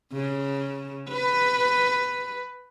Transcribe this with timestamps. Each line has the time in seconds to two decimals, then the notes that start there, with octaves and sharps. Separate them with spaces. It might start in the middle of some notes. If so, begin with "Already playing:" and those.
0.13 C#3
1.09 B4